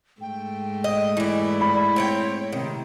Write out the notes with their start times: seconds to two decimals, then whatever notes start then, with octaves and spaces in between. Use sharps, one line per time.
0.21 G#2 A3 G5
0.84 D#5
1.17 E3 E4 D5
1.61 B5
1.96 C4 C#5 G5
2.52 C3 D#3